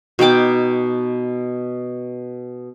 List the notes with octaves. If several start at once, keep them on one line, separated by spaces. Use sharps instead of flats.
B2 D#4 G5 D6